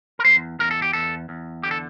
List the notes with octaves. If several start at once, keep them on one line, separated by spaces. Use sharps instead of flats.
A#4
E2 C5
E2 A#4
A4
G4
E2 A4
E2
D3 G4
A4